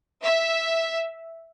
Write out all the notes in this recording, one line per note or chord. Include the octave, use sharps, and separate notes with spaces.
E5